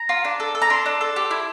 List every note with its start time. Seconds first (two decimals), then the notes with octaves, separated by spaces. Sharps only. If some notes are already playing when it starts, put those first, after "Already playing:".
Already playing: A#5
0.09 F4
0.25 D4
0.40 A4
0.55 A4
0.62 A#5
0.70 D4 C6
0.86 D4
1.01 A4
1.16 G4
1.31 E4